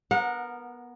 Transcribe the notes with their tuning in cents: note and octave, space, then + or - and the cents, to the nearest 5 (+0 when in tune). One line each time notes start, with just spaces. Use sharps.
B3 -15 A#4 +0 F#5 -30